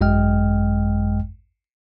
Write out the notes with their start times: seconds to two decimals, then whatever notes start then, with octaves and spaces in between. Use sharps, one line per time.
0.01 G#1 F#2 G#3 D#5 G5 F6